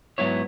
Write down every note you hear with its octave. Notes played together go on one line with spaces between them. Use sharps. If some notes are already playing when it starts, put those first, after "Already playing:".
G#2 F#3 B3 E4 C#5